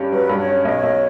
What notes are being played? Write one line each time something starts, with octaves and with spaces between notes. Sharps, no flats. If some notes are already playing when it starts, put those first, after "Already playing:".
Already playing: G2 C#4 G4
F#3 B4
G2
C#5
C#4
B1 C#5
B1